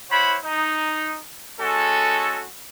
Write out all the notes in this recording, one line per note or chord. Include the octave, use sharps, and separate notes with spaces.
E4 C5 C#5 F#5 B5
D#4
G#3 C#4 F#4 A4